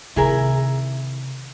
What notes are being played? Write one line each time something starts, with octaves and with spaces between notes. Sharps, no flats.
C3 D#3 E4 G#4 A#4